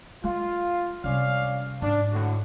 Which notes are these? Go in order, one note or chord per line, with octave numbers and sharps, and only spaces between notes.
G#3 F4
C3 G3 C#4 D5 F5
G#2 D4
A2 D3 F#4